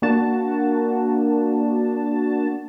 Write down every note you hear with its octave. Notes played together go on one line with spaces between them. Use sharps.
A#3 D4 F#4 A5